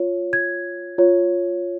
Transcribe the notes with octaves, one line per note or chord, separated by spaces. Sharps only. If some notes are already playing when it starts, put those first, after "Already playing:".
Already playing: F4 C#5
G#6
F4 C#5